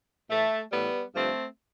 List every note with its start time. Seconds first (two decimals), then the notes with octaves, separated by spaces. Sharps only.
0.29 A2 E3 A3
0.72 A2 E3 G3 B3
1.14 G2 D3 F3 A3 C4